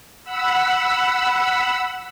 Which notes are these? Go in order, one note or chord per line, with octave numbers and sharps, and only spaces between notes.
F#5 B5 E6